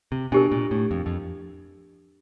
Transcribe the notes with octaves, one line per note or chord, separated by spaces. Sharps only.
C3
B2 D4 G4 A#4
A#2
A2
F2
F2